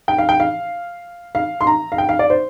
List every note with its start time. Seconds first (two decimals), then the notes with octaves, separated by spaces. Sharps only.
0.08 G5
0.18 F5
0.29 G5
0.40 F5
1.35 F5
1.61 C6
1.67 A#5
1.92 F5
1.98 G5
2.09 F5
2.19 D5
2.30 C5